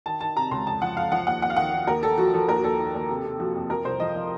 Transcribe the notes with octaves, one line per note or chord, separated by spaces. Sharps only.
D#3 A5
D#3 A5
C3 A#5
C#2 C6
F2 A5
F3 F#5
F2 F5
F3 F#5
D#2 F#5
D#2 F#5
F5
D#3 F#5
D#3
D#2 A#4
D#2 A4
F3 F#4
F3 A4
D#2 A#4
F#4
D#2 A4
D#3
D#2
C3
C3
F3 F#4
F2
F3 A#4
C2 C5
F3 D#5
F3